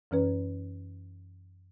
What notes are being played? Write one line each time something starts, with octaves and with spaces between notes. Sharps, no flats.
F#2 E3 C#4 B4